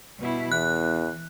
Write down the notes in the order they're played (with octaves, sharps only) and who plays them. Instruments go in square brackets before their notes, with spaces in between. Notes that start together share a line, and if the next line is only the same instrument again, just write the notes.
[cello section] B2 G3 E4
[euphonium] E2 [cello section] E3 [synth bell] F#6